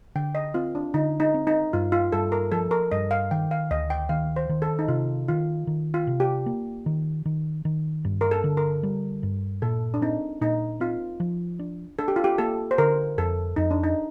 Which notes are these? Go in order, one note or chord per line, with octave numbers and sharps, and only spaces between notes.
D3 G5
D#5
C4 F4
D4
D3 D#4
D#4
C4
D#4
G2 F4
F4
G2 A4
A#4
F3 A4
A#4
G2 D#5
F5
D#3 G5
F5
D2 D#5
G5
D#3 F5
C5
D#3
A4
D#4
C3 F4
D#3 F4
D#3
F4
C3
G4
A#3
D#3
D#3
D#3
G2
A#4
A4
D3
A#4
G3
G2
A#2 A4
D4
C4 D#4
A#2 D#4
C4 F4
F3
D4
D4 A4
G4
F4
G4
A#3 A4
C5
D3 A#4
F2 A4
F2 D#4
D4
D#4